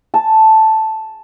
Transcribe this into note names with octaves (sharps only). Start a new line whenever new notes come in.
A5